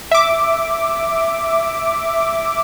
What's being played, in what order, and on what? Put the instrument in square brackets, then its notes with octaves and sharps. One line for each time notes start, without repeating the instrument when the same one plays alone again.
[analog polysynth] E5 D6